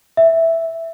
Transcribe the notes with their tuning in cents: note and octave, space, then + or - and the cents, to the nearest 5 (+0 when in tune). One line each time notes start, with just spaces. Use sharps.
E5 +0